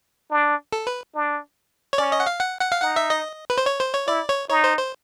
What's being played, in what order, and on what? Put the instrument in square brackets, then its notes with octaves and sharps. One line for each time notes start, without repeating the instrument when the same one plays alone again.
[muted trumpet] D4
[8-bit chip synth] A4
B4
[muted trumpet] D4
[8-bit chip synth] C#5
[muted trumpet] C#4 [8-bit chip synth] D5
[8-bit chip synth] D#5
F#5
F5
F#5
F#5
F5
[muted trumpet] D#4 [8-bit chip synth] F#5
[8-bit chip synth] E5
D#5
B4
C5
C#5
C5
C#5
[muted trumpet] E4 [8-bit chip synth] D5
[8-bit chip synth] C#5
[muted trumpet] D#4 [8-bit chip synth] C#5
[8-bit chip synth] C5
C5